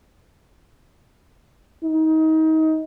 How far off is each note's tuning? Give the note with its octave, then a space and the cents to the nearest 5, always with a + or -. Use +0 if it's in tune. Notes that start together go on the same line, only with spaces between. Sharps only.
D#4 +30